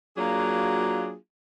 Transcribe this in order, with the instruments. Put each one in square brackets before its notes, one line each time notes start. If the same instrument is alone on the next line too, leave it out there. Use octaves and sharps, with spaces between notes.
[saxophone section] F#3 A#3 D4 F4 F#4 G#4